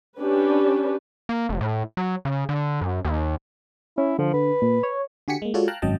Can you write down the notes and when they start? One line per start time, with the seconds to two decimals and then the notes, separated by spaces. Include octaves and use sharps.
0.18 C#4 D4 G4 B4
1.29 A#3
1.49 F1
1.61 A2
1.97 F#3
2.25 C#3
2.49 D3
2.81 F#2
3.05 D#2
3.98 C#4 E4
4.19 D3 F3
4.34 D3 B4
4.62 A#2
4.83 C#5
5.28 D3 F#4 G4 G#5 B6 C#7
5.42 G#3 A#3
5.54 G#3 F4 F#4 A4 C#5 D5
5.68 F5 G5 A5 A#5 F6 F#6
5.82 G#1 F#2 F#3 D#5 G5 A5